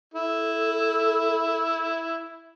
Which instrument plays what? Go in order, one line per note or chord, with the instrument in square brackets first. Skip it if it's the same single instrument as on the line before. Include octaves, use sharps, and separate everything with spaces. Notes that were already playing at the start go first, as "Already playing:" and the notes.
[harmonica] E4 [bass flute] A4